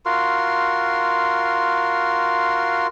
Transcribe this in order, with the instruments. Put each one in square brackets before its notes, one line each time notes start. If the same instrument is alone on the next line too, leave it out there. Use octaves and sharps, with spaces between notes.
[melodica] F4 F#4 A#4 C6